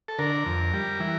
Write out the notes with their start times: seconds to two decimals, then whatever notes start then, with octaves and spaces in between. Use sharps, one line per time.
0.08 A4
0.19 D3 A#4
0.46 F2
0.74 G3
1.00 E3